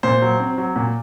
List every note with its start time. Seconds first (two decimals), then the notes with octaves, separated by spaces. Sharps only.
0.03 A#2 C5
0.22 F#3
0.40 C4
0.58 F#3
0.76 A#2